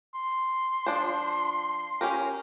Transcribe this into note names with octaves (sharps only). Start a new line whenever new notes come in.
C6
F3 D4 C5
C#4 G4 A#4